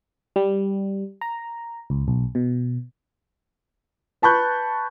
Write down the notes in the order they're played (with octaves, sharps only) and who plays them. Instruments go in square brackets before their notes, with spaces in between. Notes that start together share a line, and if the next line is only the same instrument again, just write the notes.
[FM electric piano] G3
A#5
C#2
B1
B2
[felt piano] B4 A5 B5 C#6 F#6 G6